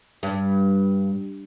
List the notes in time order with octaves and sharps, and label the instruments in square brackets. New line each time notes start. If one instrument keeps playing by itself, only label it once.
[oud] G2